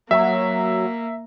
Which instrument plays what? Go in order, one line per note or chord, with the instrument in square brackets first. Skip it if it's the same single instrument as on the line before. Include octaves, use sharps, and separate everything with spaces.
[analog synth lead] F#3 [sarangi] A#3 [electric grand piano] E5